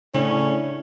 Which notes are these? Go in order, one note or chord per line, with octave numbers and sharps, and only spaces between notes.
A2 C#3 C#4 D4